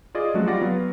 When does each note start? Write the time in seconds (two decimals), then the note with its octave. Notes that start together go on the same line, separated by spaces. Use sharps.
0.15 F4 G#4 D5 D#5
0.34 F3 F#3 G#3 A3 C#4 F#4
0.46 G3 F4 D5 F#5 A#6
0.60 F#3 B3 F4 F#4